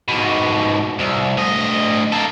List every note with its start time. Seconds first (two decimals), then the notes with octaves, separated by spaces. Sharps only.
0.08 G#2 B2
1.00 C2
1.38 D2 D#5
2.12 A#3 A4